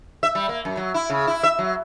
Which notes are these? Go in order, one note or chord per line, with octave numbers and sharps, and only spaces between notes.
E5
G3
A#3
F#2
F#3
E4
C#3
E4
E5
F#3